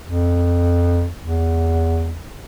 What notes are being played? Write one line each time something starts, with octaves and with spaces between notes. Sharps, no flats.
F2
E2